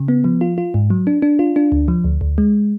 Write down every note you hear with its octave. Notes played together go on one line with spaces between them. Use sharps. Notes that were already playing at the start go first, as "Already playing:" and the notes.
Already playing: C#3
B3
F3
F4
F4
G#2
F#3
D4
D4
F4
D4
D2
F3
D2
D2
G#3